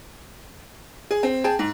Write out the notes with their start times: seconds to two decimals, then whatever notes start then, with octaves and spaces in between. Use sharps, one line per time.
1.11 G#4
1.23 C4
1.44 G#4 G5 A5
1.59 G#2